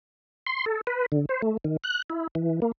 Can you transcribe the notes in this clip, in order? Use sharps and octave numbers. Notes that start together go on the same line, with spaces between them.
C6
A4
B4
D3
C5
A3
D#3
F#6
E4
E3
A#3